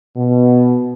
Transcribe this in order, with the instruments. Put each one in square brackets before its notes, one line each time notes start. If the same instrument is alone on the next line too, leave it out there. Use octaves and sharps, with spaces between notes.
[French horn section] B2